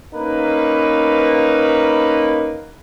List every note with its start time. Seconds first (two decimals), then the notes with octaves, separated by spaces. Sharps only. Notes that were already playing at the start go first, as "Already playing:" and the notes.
0.13 A#3 B3 C#4 D#4 A#4 B4